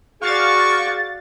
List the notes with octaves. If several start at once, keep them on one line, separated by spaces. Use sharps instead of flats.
F#4 G#4 D5 F5 G5 C#6 A6